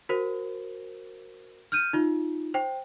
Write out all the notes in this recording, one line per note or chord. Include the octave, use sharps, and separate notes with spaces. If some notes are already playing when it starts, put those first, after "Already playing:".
F#4 A#4 C5
F6 G6 D#7
D#4 F4
C5 G5